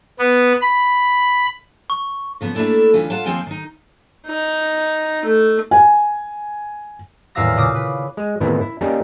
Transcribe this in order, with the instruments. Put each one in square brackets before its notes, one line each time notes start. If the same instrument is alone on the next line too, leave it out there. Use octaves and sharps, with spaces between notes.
[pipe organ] B3
B5
[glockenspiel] C#6
[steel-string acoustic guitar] C#3 F3 B3
A3 A#3 C#4 D4 E4 A4
D2 E3 C#4 F4
F4 F5 F#5 A5
D#2 F3 C4 F4 G5 G#5
D#3 D#4
[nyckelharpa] D#4
A3
[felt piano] G#5
[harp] D#1 E2 A2 F5 E6 A#6
A#2 C#3 D6 D#6
B4
[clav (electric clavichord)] G#3
A2 C3 D#3 E3 A#3 B3
E4
G3 A#3 C#4 D#4 G4